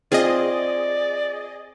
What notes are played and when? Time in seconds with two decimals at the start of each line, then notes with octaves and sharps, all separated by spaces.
0.12 C4 F4 G#4 D5 D#5